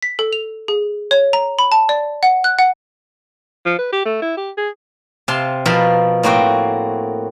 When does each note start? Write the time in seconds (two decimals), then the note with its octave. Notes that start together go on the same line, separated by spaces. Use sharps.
0.03 B6
0.19 A4
0.33 F7
0.68 G#4
1.11 C#5
1.33 A#5
1.59 B5
1.72 A5
1.89 D5
2.23 F#5
2.44 F#6
2.59 F#5
3.66 F3
3.79 B4
3.93 G4
4.05 A3
4.22 E4
4.37 G4
4.57 G#4
5.28 C3 F5 A5 C6
5.66 B2 F3 A#4 A5 B5
6.23 A2 A#3 C4 F#4 G5